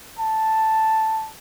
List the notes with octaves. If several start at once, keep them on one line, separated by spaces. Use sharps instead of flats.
A5